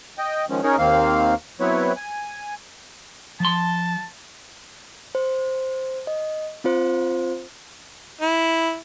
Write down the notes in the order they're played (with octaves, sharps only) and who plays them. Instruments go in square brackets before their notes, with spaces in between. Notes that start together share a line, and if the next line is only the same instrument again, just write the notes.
[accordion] D#5 G5
D#3 F3 G#3 C#4
C#4 D#4 G#4 A#4 C#5
D#2 D#3 A#3 C4 F5
F#3 B3 C4 E4 B4 C#5
G#5
[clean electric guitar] F3 C6 [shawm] A5
[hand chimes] C5
D#5
C4 F4 C5
[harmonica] E4